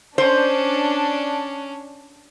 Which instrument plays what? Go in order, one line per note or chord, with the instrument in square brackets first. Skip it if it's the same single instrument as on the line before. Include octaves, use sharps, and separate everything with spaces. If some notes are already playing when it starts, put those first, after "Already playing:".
[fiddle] C#4 [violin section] D4 [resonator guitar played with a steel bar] C5